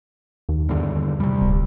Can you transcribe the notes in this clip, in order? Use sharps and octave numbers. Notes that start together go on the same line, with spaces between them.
D#2
E2 G2 D3
C3 G3
D1